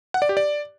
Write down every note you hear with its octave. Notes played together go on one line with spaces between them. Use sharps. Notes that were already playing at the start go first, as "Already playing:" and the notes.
F#5
D5
G4
D5